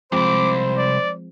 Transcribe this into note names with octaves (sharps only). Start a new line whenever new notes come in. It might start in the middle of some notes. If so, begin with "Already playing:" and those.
C2 F2 F3 G#3 C4 C5 D6
D5